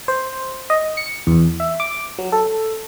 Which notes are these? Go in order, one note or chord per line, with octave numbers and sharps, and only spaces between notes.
C5
D#5
C#7
E2
E5
D6
F#3
A4